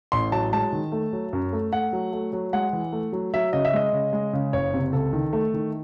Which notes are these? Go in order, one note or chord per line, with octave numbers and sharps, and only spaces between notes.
A1 C6
F#3 A5
G#3 A5
D#3
A3
F#3
F#2
A3
A3 F#5
F#3
A3
F#3
G#3 F#5
E3
A3
F#3
F#3 E5
C#3 D#5
E5
G#3 D#5
C#3
G#3
C#3
F#1 C#5
C3
C#2 A4
D#3
A3
D#3